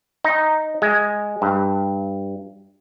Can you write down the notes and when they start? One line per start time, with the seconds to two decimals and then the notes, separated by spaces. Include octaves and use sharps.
0.24 D#4
0.82 G#3
1.42 G2